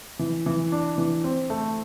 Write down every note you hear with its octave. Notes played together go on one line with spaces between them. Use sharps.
E3
E3
D4
E3
C4
A3